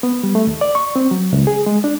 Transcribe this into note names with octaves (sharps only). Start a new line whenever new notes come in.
B3
G3
A3
D#2
D5
C#6
C4
F#3
C#2
G#4
G#3
D4